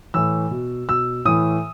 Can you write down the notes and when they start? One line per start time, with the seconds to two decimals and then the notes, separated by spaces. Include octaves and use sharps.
0.14 A2 E3 E6
0.51 B2
0.89 B2 E6
1.25 A2 E3 D#6